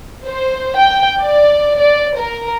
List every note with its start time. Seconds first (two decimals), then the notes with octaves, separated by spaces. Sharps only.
0.25 C5
0.77 G5
1.20 D5
1.78 D5
2.18 A#4